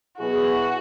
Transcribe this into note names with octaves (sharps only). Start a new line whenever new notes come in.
B2 F#3 B3 E4 F#4 G#4